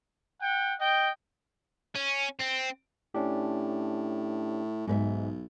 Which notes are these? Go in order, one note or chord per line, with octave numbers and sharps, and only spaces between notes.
F#5 G5
D#5 G5
C#4
C4
A2 C#4 D4 G4
B1 G#2 B4 E5